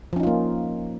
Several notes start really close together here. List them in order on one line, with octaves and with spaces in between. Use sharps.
F3 C#4 D#4 F4 A#3